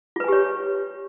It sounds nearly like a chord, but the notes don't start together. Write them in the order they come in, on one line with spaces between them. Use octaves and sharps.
F4 B4 G#5 G4 C#5